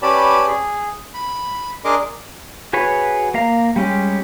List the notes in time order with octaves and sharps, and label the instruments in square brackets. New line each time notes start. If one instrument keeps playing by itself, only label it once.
[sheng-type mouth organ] C#4 G4 B4 D5 A5 B5
G#4
B5
D4 G#4 A#4 D#5 C6 D6
[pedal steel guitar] F#4 G#4 B4 C#5
A#3 F5 A#5
G3 G#3 C#4 G4